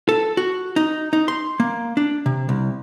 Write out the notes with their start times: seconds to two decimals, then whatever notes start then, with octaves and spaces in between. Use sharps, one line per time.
0.09 A4
0.37 F#4
0.76 D#4
1.13 D#4
1.28 C6
1.60 A#3
1.97 D4
2.26 C3
2.49 C2